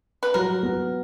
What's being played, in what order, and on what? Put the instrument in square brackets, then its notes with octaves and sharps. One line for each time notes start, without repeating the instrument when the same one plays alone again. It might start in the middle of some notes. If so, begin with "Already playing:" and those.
[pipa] B4
[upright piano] F#3 [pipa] A#4
[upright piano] B3